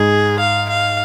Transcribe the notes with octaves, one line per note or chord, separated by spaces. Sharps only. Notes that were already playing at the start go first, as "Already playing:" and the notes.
Already playing: G#2 G#4
F5
F5